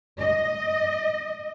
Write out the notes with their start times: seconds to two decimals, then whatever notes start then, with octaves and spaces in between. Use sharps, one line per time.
0.19 D#5